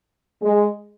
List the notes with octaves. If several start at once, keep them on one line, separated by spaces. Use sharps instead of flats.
G#3